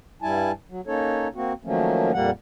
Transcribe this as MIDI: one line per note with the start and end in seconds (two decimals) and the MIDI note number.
0.22 0.52 43
0.22 0.52 55
0.22 0.52 64
0.22 0.52 80
0.22 0.52 81
0.69 0.81 54
0.87 1.28 58
0.87 1.28 61
0.87 1.28 63
0.87 1.28 69
0.87 1.28 73
1.35 1.53 58
1.35 1.53 60
1.35 1.53 66
1.64 2.12 51
1.64 2.12 53
1.64 2.12 54
1.64 2.12 57
1.64 2.12 58
1.64 2.12 61
2.13 2.31 41
2.13 2.31 46
2.13 2.31 55
2.13 2.31 58
2.13 2.31 78